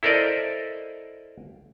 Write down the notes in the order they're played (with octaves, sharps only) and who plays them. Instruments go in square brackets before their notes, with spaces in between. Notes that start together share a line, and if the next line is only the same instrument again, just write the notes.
[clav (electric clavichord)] E4 A4 A#4 C5 D5 D#5